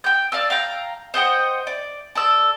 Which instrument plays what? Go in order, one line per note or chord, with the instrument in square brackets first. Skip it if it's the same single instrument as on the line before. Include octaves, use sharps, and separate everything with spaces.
[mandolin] G5 G6
D5 F5 A5 E6
F5 G5 A#5
C5 D#5 F#5 G5
D5
A4 D5 E6